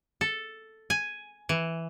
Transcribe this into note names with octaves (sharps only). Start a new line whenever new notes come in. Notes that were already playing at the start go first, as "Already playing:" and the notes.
A4
G#5
E3